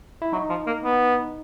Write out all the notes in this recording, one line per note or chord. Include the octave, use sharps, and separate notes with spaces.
E4
F#3 D#4
F3
A#3
B3